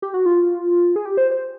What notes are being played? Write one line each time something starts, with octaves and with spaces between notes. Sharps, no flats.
G4
F#4
F4
G#4
G4
C5
C5